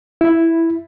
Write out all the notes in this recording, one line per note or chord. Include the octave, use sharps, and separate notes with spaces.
E4